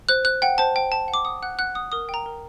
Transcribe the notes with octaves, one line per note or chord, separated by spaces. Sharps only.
C5 F#6
C5 F#6
F#5 G5
C5 A5
C5 G5
C5 A5
F#5
D6
F#5 D#6
F#5 F#6
F#5 F#6
F#5 D#6
A#4 D#6
G5
A#5
A#4